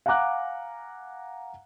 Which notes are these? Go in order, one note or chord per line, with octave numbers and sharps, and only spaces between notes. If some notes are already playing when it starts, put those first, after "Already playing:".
F5 F#5 G#5 A#5 D6 F#6